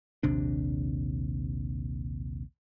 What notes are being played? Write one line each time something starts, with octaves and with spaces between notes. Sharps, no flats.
A#1 D#2 C3 D4